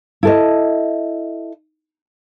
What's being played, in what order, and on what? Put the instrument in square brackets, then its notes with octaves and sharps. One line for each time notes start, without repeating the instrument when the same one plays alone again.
[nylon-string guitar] E4 A4 D#5